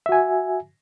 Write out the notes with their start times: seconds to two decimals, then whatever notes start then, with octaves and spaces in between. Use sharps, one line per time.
0.06 E5
0.09 F#4
0.12 G#5